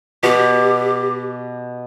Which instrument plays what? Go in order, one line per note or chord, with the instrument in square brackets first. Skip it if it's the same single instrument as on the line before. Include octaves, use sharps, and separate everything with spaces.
[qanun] B2 [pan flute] G4